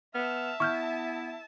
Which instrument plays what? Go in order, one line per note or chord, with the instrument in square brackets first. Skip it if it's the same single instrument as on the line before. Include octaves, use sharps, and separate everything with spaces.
[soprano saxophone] B3 [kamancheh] E5 A5 [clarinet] F6
[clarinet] B3 [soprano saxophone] E4 [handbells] C#6 F6 G6